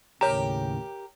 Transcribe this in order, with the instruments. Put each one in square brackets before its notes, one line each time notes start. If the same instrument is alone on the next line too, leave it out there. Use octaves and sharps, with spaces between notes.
[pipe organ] D#2 A2 C#3 [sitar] G4 A#4 [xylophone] C#5 A#5